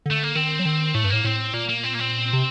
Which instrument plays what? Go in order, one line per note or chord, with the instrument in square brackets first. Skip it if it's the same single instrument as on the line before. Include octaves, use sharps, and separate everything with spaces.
[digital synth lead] D3 [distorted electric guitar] A3
[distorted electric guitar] A#3
[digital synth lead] D#3 [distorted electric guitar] C4
[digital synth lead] F#3
D#3
[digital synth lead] A2 [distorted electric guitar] A3
[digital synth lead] G2
[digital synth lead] A2 [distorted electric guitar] A#3
[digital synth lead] A2 [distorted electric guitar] C4
[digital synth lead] A#2 [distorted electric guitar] A#3
[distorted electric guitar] A#3
C4
A#3
C4
[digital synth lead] C3